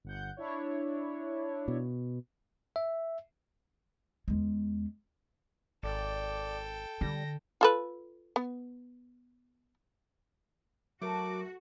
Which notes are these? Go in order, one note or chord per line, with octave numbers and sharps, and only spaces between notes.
G1 F#5 G6
D4 E4 C#5
B2
E5
E2 G#3
G#1 A4 D5 G5
D3 G3 A#6
F4 A4 B4
B3
F#3 A3 F#4 A#4 D6